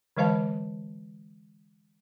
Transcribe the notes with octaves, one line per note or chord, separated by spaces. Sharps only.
D3 E3 G#3 C5 F5 A5